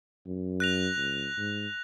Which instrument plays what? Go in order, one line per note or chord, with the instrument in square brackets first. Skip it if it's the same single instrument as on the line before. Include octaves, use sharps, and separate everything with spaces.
[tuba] F#2
[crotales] F#6 A#6 F7
[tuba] C#2
G#2